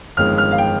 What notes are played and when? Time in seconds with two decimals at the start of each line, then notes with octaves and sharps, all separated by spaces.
0.17 G1 F2 D#3 G#3 F6
0.38 F6
0.51 F5
0.58 G5